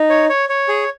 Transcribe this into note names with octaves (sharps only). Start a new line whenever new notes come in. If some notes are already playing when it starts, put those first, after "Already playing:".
Already playing: D#4
C#5
C#5
C#5
G#4